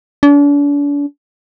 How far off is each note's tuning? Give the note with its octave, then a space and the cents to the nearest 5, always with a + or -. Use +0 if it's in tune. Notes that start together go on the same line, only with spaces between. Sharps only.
D4 -40